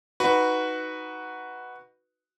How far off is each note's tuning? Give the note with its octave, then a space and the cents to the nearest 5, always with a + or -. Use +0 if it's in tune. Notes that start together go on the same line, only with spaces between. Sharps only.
D#4 +15 F#4 +0 B4 +0